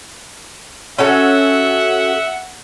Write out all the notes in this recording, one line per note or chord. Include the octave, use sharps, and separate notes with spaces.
C#4 F#4 A4 E5 F#5